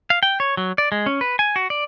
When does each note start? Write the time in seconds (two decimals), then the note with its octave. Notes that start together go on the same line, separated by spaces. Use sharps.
0.10 F5
0.23 G5
0.40 C#5
0.57 F#3
0.78 D5
0.92 G#3
1.06 C#4
1.21 B4
1.39 G#5
1.56 F#4
1.70 D5